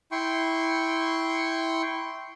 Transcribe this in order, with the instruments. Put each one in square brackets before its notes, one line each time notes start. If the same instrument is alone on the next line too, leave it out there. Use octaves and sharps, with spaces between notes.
[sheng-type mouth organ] E4 G5 C6 C#6